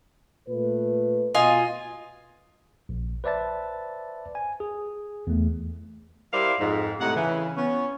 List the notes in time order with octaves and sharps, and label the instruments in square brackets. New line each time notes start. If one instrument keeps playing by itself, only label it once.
[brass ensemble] A#2 A3 B4
[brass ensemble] B2 [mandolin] F4 D#5 G#5
[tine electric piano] A#1
B4 C5 D5 E5 A5 A6
G#5
G#4
E2 A3
[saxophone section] G3 E4 A#4 C5 D5 F5
F2 G#2
A2 C3 G#3 D#4 F#5
C#3 E3
B3 C#4